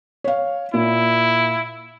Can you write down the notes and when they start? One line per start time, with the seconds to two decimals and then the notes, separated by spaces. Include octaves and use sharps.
0.24 C#5 F5
0.74 A#2 E4